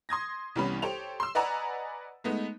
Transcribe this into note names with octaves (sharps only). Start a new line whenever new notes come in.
C6 D#6 G#6 A#6
C2 E3 G3 B3 C#4 B5
G4 A4 C5 C#5 F7
C6 E6
B4 D5 D#5 F#5 G#5 A#5
G#3 A3 B3 D#4